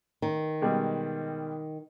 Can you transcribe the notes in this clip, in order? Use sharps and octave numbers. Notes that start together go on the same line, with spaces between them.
D#3
B2 G3 G#3